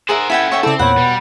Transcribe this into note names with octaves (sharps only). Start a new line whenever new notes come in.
G#4 A#4 C5 E5 F#5
C#4 E4 A4 B4 F#5 G5 G#6 B6
C#5 E5 G5
C#3 C4 E4 A4 D5
E2 A#2 C#5 F#5 B5
B2 G3